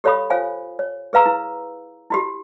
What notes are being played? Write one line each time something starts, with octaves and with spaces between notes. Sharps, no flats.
G4 A4 C#5 F5 B5 D#6
F4 C5 C#5 F5 G#5
C#5
G#4 B4 F5 A#5 E6
E4
E4 F#4 G4